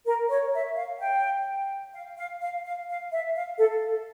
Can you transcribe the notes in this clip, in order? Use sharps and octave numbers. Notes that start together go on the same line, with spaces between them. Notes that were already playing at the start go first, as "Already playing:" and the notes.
A#4
C#5
E5
F5
G5
F5
F5
F5
F5
F5
E5
F5
A4